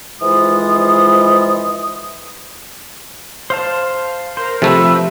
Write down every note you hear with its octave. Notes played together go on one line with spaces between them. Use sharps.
F2 G#2 E3 G#3 F4 D#6
C5 F5 A5
A#4 C5
C3 F3 A3 A4 B4 E5